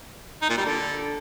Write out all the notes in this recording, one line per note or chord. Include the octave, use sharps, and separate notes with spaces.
D#4
A#2
G3
D3